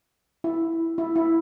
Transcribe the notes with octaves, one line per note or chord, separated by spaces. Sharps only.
E4
E4
E4